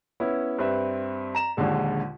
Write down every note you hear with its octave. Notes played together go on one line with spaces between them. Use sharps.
B3 C#4 E4
G2 C4 B4 E5
A#5 E7
A#1 D#2 A#2 D3 G#3